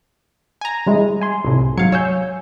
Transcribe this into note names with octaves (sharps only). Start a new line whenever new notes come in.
G#5 A#5
G3 G#3 E4
G#5 C6
C2 A2 C3
G#2 F#3 F5 G#6 C#7
C#5 G#5 E6 G6